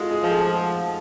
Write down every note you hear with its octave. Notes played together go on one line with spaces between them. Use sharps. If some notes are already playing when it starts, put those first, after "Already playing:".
Already playing: G#3 F4 F#4 A4
G#4
F3
A4